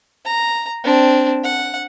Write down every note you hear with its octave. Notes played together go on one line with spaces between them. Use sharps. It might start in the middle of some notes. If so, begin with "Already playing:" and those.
A#5
C4 D4
F#5